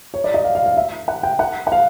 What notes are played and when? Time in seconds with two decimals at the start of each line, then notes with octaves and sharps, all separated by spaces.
0.14 C#5
0.24 D5
0.34 D#5
0.45 F5
0.55 F5
0.66 F5
0.77 E5
1.08 F#5
1.23 G5
1.39 F#5
1.67 F#5
1.72 F5